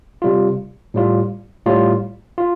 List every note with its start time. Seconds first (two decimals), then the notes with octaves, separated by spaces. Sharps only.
0.22 C3 G3 F4
0.94 A2 G3 F4
1.66 A2 G3 F4
2.38 F4